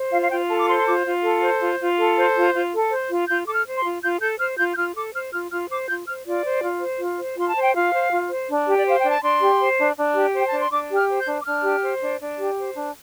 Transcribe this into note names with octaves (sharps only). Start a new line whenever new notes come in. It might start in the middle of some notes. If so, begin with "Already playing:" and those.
Already playing: C5
F4 F5
F5
F4 G5
A4 A5
D6
C5 C6
C6
F4 D6
F4
A4
C5
F4
F4
A4
C5
F4
F4
A4
C5
F4
F4 G6
A4 D6
F6
C5
C6
F4
F4 G6
A4 G6
C5 F6
F4 G6
G6
F4 F6
A4 D6
C5 F6
F4 F6
F4 F6
C5 D6
F4 G6
C5 F6
F4 D5
C5
F4
C5
F4
C5
F4 C6
A5
C5
G5
F4 F5
C5
F4
C5
D4
G4
D5
C5 F5
D4 G5
A5
D4 C6
G4
C5
D4
D4
G4
C5 G5
D4 A5
C6
D4 D6
G4
F6
C5
G6
D4
D6
D4 F6
G4
C5
D4
D4
G4
C5
D4